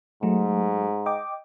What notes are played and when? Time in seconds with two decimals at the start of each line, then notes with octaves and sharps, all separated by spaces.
0.23 G#2 F#3 A3
1.06 D#5 G5 D6